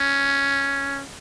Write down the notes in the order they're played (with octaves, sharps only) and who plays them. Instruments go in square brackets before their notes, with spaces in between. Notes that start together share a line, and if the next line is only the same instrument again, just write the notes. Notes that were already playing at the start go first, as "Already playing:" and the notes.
Already playing: [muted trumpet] C#4